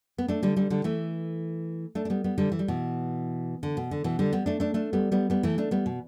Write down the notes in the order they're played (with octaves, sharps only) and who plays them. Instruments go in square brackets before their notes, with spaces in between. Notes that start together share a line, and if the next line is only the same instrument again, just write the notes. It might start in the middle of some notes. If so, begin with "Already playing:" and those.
[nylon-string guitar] B3
A3 D4
D3 G3
D3 G3
D3 G3
E3 A3
A3 D4
D4
G3 B3
G3 B3
D3 G3
E3
G3
B2 E3
D3
B2
D3
B2 E3
D3 G3
G3 B3
A3 D4
A3 D4
A3 D4
G3 B3
G3 B3
G3 B3
E3 A3
A3 D4
G3 B3
B2